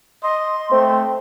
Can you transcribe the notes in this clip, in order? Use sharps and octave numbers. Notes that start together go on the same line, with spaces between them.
D#5 C6
A3 C4